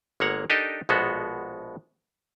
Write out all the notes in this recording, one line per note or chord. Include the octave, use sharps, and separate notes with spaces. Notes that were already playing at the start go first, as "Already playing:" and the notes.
G1 G#3 A#3 C#5 F#5 A#5
D4 D#4 G4 A4 A#4 D#5
A#1 B2 G#3 B3 F#4 A4